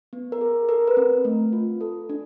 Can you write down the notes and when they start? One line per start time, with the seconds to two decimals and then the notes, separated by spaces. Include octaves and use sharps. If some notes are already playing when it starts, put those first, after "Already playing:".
0.13 B3
0.32 A#4
0.41 G#4
0.69 A4 A#4
0.88 B4
0.97 C4
1.25 A3
1.53 F4
1.81 A4
2.09 D4